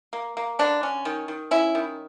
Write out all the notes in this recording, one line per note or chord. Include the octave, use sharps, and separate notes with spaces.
A#3
A#3
D3 D4
C#4
D#3
D#3
C#4 E4
D#3